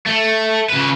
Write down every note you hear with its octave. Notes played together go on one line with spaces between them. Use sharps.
A3
C#3 B4